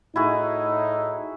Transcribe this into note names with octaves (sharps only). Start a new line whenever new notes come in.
A2 D#4 E4 F#4 G#4